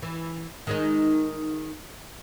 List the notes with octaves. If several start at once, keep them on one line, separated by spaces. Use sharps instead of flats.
E3
D#3 G#3 D#4